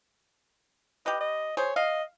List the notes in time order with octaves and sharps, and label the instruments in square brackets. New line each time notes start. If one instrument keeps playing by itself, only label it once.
[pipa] G4 B4 [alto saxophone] D#5
[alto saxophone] D#5
[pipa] G#4 C5 [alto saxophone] C#5
[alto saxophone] D#5 [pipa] F5